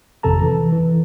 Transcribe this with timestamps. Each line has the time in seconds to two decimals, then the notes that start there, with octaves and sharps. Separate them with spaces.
0.23 G#1 F2 C3 A4 A5 A#5
0.42 E3
0.72 E3